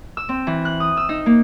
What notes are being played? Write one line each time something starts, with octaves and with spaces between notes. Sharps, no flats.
E6
C4
E3
F#6
D#6
E6
D#4
A#3